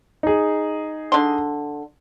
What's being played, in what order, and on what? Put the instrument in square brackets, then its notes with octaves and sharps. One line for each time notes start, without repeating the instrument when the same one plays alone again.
[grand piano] D#4 G#4
[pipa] D3 C6